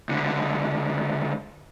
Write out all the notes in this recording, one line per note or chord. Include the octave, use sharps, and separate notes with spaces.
C#2 D3